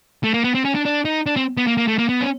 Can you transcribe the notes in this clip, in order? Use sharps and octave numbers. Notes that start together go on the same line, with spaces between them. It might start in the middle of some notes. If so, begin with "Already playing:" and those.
A3
A#3
B3
C4
C#4
D4
D4
D#4
D4
C4
B3
A#3
A#3
A3
A#3
B3
C#4